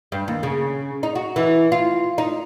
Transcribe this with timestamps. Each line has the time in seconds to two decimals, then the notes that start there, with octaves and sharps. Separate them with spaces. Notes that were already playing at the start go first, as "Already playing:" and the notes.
0.12 G2
0.28 D#2
0.43 C#3
1.03 D#4
1.15 F#4
1.36 E3
1.72 F4
2.18 D#4